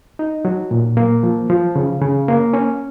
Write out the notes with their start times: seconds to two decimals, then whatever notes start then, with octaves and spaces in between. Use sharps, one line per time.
0.19 D#4
0.45 F#3
0.71 A#2
0.97 A#3
1.23 F3
1.50 F3
1.76 C#3
2.02 C#3
2.28 A#3
2.53 C#4